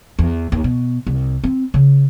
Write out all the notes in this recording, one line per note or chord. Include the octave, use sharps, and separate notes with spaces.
E2
D#2
B2
C2
C4
C#3